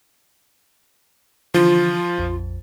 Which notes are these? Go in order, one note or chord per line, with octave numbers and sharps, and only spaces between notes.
D3 E3 F3 F4
A#1 F2